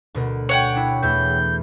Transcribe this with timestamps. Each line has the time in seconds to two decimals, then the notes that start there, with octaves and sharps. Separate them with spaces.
0.15 D2 B2 A#4
0.49 C#5 F#5 G5
0.75 D4 E4
1.02 E2 A3 E4 G6